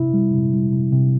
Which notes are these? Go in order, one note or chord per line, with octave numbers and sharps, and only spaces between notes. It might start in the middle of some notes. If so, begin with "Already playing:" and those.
Already playing: C3 E4
G3
C3
G3
C3
C3